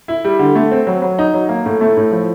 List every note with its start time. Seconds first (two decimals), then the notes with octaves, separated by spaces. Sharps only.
0.08 E4
0.24 G3
0.39 D3
0.56 A3
0.71 C4
0.87 F#3
1.02 F#3
1.19 D#4
1.34 F#3
1.49 A#3
1.66 A2
1.81 A3
1.97 A2
2.12 F3